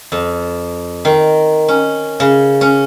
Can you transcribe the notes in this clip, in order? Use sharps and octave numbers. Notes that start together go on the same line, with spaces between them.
F2
D#3
C#4
C#3
C#4